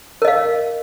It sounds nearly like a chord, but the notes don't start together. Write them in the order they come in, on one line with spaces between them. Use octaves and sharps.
A#4 D#5 F5